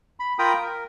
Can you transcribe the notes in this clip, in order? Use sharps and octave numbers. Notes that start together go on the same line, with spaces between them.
B5
F4 A#4 G5 A#5 B5 D#6
A#4